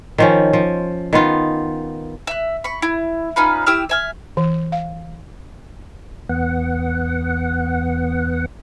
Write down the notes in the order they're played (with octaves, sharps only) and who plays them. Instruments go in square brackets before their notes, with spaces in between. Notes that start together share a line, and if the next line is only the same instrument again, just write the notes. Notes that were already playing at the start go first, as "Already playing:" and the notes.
[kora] D#3 F3 C#4
F3
D#3 B3 F4
[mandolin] E5 F#6
B5 C#6
E4
C#4 D#4 F4 B4
E4 G4 E6 F6
E5 G#5 F6
[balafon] E3
F5
[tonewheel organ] E2 B3 F#5